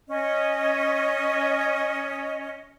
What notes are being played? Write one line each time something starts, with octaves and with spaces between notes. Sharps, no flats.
C#4 D#5